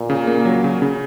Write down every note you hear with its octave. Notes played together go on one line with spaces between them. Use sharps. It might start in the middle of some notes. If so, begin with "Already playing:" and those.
Already playing: A#2
C#3
A#3
F#3
C#3
C#3